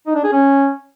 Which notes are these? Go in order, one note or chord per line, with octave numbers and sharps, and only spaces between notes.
D#4
D4
G#4
C#4